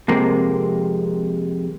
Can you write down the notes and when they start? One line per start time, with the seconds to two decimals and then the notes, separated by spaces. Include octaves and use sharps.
0.08 F2 C3 G#3 A#3